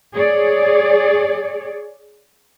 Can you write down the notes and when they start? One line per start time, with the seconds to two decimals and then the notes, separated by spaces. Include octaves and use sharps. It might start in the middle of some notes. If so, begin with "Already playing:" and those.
0.14 G#4 C#5 D5